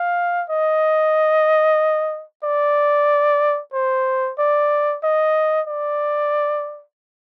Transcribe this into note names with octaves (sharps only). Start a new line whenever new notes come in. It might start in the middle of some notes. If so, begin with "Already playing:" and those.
Already playing: F5
D#5
D5
C5
D5
D#5
D5